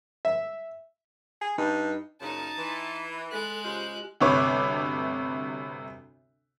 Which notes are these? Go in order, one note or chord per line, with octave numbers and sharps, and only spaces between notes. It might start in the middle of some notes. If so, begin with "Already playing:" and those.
E5
G#4
G2 D#4
F#2 A#2 C#3 D#4 A5
E3 C6
B5
G#3 A4 F#6
C#3 F4 G4 C5 D#5
G1 D2 C3 B4 C#5 D6